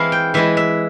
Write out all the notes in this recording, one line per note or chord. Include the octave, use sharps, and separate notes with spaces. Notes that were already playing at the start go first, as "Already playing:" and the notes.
Already playing: E3 G#3 C4 E4 F5
G5
E3 G#3 E4 E5
E5